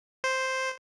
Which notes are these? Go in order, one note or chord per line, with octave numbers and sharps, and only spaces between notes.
C5